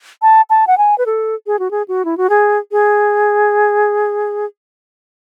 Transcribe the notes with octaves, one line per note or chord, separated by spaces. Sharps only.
A5
A5
F#5
G#5
B4
A4
G#4
F#4
G#4
F#4
E4
F#4
G#4
G#4